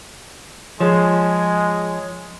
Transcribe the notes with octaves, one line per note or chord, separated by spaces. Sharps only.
F3 G#3 G#4 C#5